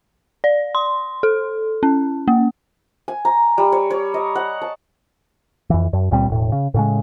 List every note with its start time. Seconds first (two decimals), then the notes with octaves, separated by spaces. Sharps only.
0.44 D5
0.75 C6
1.23 A4
1.83 C#4
2.28 A#3
3.08 G#5
3.25 A#5
3.58 G3
3.72 C#5
3.90 C#5
4.14 D#5
4.36 F#5
4.62 A5
5.70 F2 E3
5.93 F#2
6.11 C#2 A#2 G3 C4
6.28 E1 A2
6.52 C#3
6.74 A2 C#3 G#3